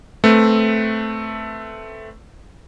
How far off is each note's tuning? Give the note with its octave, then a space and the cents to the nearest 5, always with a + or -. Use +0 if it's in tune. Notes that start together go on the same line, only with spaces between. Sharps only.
A3 +0 C4 +0 B4 +0